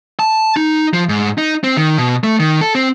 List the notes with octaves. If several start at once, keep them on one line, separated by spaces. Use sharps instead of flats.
A5
D#4
F3
G#2
D#4
C4
D#3
B2
A3
D#3
A4
C4